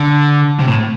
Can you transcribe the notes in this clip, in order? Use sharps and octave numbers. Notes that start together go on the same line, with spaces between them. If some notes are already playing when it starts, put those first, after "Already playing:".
Already playing: D3
C3
A2